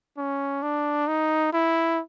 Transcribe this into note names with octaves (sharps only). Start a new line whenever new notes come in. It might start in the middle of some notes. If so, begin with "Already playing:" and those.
C#4
D4
D#4
E4